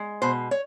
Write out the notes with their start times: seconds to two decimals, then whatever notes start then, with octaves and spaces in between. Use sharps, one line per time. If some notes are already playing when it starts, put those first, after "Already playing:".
Already playing: G#3
0.22 B2 C5
0.51 C#5